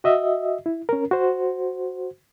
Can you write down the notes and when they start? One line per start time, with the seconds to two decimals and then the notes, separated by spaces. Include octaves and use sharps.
0.04 F#4 D#5 E5
0.66 E4
0.89 C#4 A#4
1.11 F#4 C5